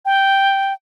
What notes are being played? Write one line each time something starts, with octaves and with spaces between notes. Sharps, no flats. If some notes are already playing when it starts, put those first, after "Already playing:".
G5